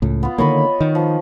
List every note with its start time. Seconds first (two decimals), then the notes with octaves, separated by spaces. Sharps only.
0.02 C#2 A2
0.23 B3 F4
0.38 D3 D#3 A#3 C#5 D#5 B5
0.80 D#3
0.95 F3